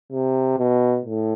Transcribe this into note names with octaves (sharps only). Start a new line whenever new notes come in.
C3
B2
A2